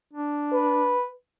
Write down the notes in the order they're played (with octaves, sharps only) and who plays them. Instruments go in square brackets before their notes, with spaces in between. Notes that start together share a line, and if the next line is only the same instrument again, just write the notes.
[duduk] D4
[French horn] B4